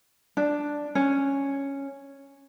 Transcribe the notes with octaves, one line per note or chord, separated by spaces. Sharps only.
D4
C#4